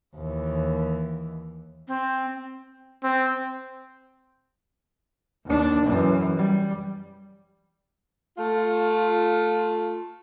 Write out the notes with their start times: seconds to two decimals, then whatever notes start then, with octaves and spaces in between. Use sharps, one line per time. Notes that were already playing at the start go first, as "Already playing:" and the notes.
0.15 D#2 E3
1.88 C4
3.04 C4
5.46 D#2 D4
5.87 F#2 E3
6.37 G3
8.38 A3 F4